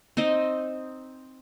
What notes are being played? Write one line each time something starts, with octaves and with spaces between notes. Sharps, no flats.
C4 D#4 C5 D#5